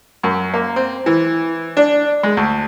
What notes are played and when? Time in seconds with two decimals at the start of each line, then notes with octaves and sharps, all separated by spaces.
0.23 F#2
0.54 A#3
0.76 C4
1.06 E3
1.77 D4
2.23 G#3
2.37 D2